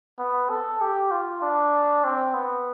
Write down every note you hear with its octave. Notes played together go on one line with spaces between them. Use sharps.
B3
A4
G4
F4
D4
C4
B3